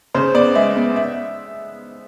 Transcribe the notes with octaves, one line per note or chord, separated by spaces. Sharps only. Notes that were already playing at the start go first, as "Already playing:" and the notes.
C#3 C5
B3 D5
G#3 E5
B3
E5